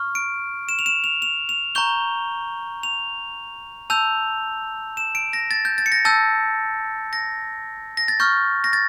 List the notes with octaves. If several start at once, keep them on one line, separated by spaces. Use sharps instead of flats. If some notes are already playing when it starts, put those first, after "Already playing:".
Already playing: C#6 F6
D7
E7
F7
E7
F7
F7
F7
A#5 C#6 G6 G7
F7
A5 E6 G6 F7
E7
D7
A#6
A6
G6
A6
C#7
A#6
A5 E6 G6 A6
A#6
A#6
A6
C#6 F6 G6
A#6
A6